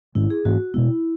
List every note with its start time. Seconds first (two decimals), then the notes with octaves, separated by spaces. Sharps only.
0.15 G#2 D#3 G#3 C#4 E4
0.30 G#4
0.45 G#2 E3 A#3 C#4 F#4
0.74 B2 G#3 B3 E4